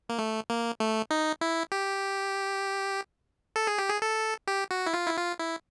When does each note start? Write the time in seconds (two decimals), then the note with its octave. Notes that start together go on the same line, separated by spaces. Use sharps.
0.09 A#3
0.18 A3
0.50 A#3
0.80 A3
1.11 D#4
1.41 E4
1.72 G4
3.56 A4
3.67 G#4
3.78 G4
3.90 G#4
4.02 A4
4.47 G4
4.71 F#4
4.86 E4
4.94 F4
5.07 E4
5.17 F4
5.39 E4